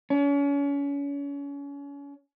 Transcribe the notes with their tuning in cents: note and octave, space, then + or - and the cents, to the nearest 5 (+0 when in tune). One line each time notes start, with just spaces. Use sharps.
C#4 +35